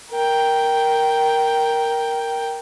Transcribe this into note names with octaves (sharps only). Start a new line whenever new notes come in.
A#4 G5